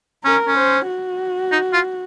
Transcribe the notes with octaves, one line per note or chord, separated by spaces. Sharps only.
C#4 A#4
C#4
C5
F#4
D#4
F4